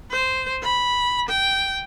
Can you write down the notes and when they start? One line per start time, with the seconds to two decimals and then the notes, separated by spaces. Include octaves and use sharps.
0.11 C5
0.63 B5
1.29 G5